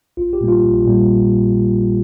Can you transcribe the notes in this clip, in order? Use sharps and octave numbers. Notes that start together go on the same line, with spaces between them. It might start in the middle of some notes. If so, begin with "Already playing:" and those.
A#1 F4
G4
A#2 G3 A#3
F4
A#1
A#2 G3 A#3